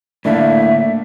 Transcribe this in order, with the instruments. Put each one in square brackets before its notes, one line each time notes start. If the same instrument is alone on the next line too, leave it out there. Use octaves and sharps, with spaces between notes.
[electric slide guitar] A2 D3 [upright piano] A3 A#3 D4 [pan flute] E5